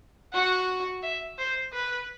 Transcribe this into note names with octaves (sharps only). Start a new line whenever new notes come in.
F#4 F#5
E5
C5
B4